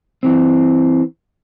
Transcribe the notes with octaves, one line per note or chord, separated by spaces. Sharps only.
E3 C4